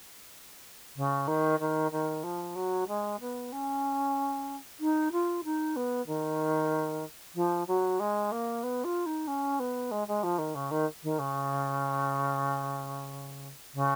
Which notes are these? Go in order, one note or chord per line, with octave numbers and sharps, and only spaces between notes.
C#3
D#3
D#3
D#3
F3
F#3
G#3
B3
C#4
D#4
F4
D#4
B3
D#3
F3
F#3
G#3
A#3
B3
F4
D#4
C#4
B3
G#3
G#3
F3
D#3
C#3
D#3
D#3
C#3
C#3